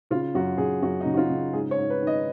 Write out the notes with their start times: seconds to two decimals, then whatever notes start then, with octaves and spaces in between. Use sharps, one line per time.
0.10 C#3 F4
0.34 F#2 F#4
0.58 C#3 G#4
0.82 F#2 F#4
1.01 D#4
1.06 C#3
1.14 F#4
1.17 F4
1.29 C#3
1.53 G#2 G#4
1.71 C#5
1.78 G#2
1.90 B4
2.01 D#3
2.07 D#5